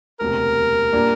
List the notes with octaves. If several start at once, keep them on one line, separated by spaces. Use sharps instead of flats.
E1 D2 C3 A#4
A#2 G3 A#3 D4